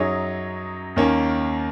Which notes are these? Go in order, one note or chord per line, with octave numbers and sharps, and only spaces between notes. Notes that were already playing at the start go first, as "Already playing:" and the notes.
Already playing: F#2 F#3 D#4 G#4 C#5
D#2 D#3 A#3 C#4